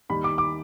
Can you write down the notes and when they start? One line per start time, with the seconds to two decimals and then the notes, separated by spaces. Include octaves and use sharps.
0.09 D#2 D#3 G3 B5
0.24 D6
0.38 D6